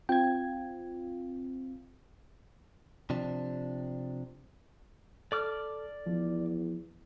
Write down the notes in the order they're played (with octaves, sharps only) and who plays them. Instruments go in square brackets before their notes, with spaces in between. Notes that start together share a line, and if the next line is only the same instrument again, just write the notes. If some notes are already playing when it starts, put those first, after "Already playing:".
[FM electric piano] C4 F4 [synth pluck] G5 G#6
[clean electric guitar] C3 F3 D4
[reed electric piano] A4 [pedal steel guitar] D5 D6 F6
[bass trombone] E2 [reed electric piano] F3